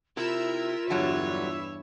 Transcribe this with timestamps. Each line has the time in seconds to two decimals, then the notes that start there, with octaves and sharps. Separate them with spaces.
0.17 C3 E4 F4 A#4 E5 E6
0.90 E2 G2 D3 F#3 G3 C#5